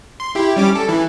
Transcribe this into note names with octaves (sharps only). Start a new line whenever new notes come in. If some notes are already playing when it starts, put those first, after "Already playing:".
C6
E4 G4
G3 C#4 D6
A4
E3